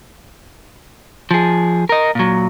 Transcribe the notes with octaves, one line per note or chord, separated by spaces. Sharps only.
F3 G#4
A#4 D#5
A#2 F#3